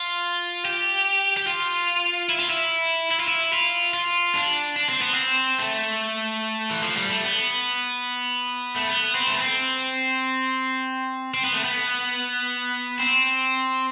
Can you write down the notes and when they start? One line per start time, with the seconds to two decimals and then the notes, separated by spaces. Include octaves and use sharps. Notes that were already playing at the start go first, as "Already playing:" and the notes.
Already playing: F4
0.65 G4
1.37 G4
1.47 F4
2.29 E4
2.40 F4
2.50 E4
3.11 E4
3.20 F4
3.28 E4
3.53 F4
3.94 F4
4.35 D4
4.76 D4
4.89 C4
5.02 B3
5.14 C4
5.59 A3
6.71 E3
6.83 F3
6.97 G3
7.09 A3
7.24 B3
8.76 A3
8.87 B3
9.15 C4
9.27 A3
9.35 B3
9.42 C4
11.34 C4
11.44 B3
11.54 A3
11.64 B3
12.99 C4